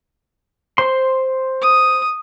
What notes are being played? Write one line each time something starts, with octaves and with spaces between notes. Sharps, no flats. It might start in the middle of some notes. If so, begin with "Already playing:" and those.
C5 C6
D#6